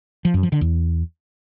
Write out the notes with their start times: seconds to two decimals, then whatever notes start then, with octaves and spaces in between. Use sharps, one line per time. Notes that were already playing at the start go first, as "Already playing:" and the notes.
0.25 F3
0.34 F#2
0.43 F3
0.52 D3
0.61 E2